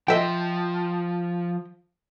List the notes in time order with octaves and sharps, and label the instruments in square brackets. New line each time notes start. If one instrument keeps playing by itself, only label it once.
[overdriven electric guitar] F3 [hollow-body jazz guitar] D#5 E5 G5